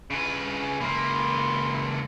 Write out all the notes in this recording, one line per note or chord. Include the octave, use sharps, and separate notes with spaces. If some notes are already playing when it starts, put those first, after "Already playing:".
C#3 B4
C#2 A#3 E5 B5 C6